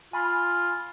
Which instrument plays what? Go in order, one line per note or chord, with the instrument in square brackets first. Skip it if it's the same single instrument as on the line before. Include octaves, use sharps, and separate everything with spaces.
[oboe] F4 [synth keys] G#5 B5